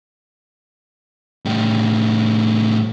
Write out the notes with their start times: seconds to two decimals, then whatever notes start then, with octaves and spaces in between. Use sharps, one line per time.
1.45 A2 G3